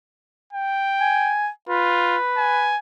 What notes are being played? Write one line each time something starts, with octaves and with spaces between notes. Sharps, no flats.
G5
G#5
F4 B4
G#5